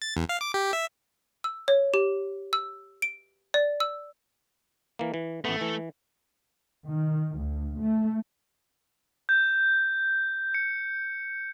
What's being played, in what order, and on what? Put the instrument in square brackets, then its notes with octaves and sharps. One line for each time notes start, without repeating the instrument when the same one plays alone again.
[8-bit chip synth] A6
E2
F5
D6
G4
E5
[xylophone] E6
C#5
G4
E6
D7
D5
E6
[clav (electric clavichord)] E3 A#3
E3
[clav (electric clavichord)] A1 B3 [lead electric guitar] A3
[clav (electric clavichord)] E3
[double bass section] D#3
D2
A3
[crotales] G6
C#7